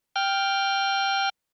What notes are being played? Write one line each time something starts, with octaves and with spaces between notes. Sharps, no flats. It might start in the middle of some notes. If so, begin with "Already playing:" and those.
G5 F6